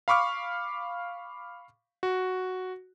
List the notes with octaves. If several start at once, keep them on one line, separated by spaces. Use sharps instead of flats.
F5 B5 C#6 D6 F6
F#4